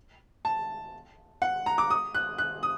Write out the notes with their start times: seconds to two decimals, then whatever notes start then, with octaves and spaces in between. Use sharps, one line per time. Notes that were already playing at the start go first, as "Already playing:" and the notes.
0.45 A5
1.42 F#5
1.66 A#5
1.78 D6
1.90 D#6
2.15 F#6
2.38 F#6
2.63 D#6